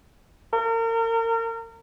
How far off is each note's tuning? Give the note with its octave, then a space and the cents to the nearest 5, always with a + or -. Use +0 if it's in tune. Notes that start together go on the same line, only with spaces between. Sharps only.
A#4 -35